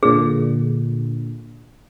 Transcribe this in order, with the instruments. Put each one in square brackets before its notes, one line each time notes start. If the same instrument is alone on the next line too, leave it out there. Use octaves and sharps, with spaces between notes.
[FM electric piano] A#2 D3 [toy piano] G#4